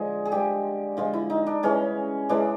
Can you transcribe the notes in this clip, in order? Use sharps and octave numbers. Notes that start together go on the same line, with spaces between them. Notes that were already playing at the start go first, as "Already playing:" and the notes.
Already playing: D3 F3 G#3 G#4
G#4
D3 F3 G#3 G4
D3 F3 G#3 F4
E4
D#4
D4
C#3 E3 G#3 C#4
C#3 E3 G#3 D4